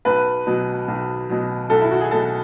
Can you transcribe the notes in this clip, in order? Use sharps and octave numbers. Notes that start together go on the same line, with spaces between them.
B1 B4
B2 F#3
B1
B2 F#3
B1 A4
E4
F#4
G#4
B2 F#3 A4